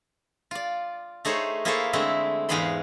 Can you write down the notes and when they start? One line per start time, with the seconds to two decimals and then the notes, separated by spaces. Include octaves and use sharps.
0.51 F4 D5
1.25 A3 D#4 G#4 C5 C#5
1.65 A#3 E4 G#4 A4 C5 C#5
1.93 D3 G#3 A3 C4 E4
2.49 E2 G#2 G#4 F5 B5 C6